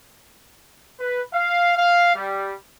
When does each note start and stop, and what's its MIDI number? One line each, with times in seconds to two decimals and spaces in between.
1.00 1.21 71
1.34 1.75 77
1.77 2.13 77
2.15 2.54 55